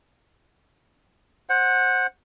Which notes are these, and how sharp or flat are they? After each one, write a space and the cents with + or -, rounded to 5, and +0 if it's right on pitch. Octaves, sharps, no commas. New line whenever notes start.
C5 +20 F#5 -5